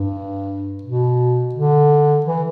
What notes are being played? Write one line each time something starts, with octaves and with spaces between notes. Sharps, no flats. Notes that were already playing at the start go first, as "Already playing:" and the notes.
Already playing: G2
B2
D3
E3